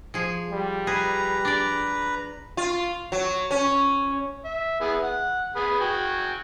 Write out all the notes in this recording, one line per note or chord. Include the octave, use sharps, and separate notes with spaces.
F3 G#4
G3
G#4 B4 A#5
D4 D5
F4
F#3
C#4
E5
B3 E4 G#4
F#5
G#4 B4 B5
F#4 G5 G#5